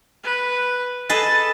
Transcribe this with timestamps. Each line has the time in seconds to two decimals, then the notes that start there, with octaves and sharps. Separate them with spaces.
0.23 B4
1.09 G#4 A4 B4 D#5 A6